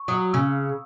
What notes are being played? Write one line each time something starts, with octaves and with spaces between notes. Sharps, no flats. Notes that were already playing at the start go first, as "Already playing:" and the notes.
Already playing: C#6
F#3 D#6
C#3 E6